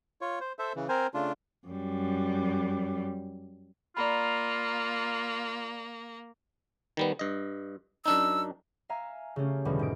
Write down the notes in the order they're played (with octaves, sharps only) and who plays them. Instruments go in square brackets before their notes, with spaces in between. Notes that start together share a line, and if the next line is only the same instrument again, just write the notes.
[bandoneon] F4 C#5
C5
A4 C5 E5
C#3 E3
C4 A#4 C5 G#5
C#3 A3 D4 F4
[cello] F#2 G3
[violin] A#3 [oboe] F4 [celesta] D5 A#5 B5
[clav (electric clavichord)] D#3 G3 B3
G2 D#5
[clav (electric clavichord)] F#2 D4 D#4 [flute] E6
[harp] E5 F5 G#5 A#5
C#3 A3 C#4 G4
E2 B2 D3 G3
G#2 G#3 D7